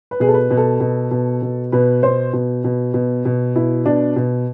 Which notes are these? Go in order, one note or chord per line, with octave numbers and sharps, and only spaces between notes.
B4
B2 G#4
A4
B4
B2
A4
B2
B2
B2
B2 B4
B2 C5
B2
B2
B2
B2
B2 E4
B2 D4
B2